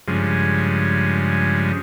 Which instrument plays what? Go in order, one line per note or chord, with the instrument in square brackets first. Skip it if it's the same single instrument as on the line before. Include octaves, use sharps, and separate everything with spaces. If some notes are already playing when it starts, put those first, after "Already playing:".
[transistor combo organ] G2 C#3 F3 G#3